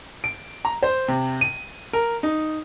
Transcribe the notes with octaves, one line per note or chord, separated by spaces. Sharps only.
D7
A#5
C5
C3
D#7
A#4
D#4